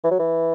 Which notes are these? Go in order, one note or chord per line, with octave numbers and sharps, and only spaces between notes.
E3
F#3
E3